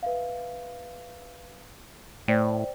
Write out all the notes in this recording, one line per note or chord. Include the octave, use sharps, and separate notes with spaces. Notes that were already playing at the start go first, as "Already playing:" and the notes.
B4 E5 F5
A2 C5 D5 G5